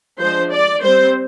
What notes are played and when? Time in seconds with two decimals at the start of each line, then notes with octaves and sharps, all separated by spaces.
0.19 F3 G#3 D4 C5
0.52 D5
0.83 G3 C5
0.88 C4